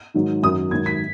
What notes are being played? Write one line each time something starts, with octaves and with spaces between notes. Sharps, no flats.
G#2 D#3 F#3
F#2 D#3 F#3 D#6
G#2 D#3 F#3 G#6
B6